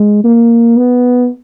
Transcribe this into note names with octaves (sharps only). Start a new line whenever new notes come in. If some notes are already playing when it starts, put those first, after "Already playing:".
Already playing: G#3
A#3
B3